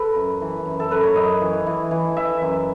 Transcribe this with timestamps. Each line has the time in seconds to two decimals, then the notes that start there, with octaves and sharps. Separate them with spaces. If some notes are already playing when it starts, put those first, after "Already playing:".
Already playing: A4 B4
0.16 F#2
0.41 E3
0.66 F#2
0.80 A4
0.91 F#2 B4
1.03 C#5
1.16 F#2 D#5
1.41 E3
1.66 E3
1.91 E3
2.16 E3 E5
2.42 F#2